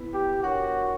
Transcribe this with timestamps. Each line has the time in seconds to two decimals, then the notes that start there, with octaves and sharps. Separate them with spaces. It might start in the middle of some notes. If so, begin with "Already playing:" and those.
Already playing: B3 E4 B4
0.13 G4
0.43 D4 F#4 A#4 C#5 F#5